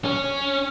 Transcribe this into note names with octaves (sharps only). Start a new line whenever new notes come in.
C#4